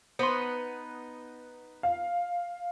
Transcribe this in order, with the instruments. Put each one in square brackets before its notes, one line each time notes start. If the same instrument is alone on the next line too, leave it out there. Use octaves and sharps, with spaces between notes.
[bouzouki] B3 D#4 B4 [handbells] C5 C6
[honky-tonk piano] F5